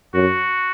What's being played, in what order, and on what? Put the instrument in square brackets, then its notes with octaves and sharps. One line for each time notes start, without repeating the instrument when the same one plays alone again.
[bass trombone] F#2 [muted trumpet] F#4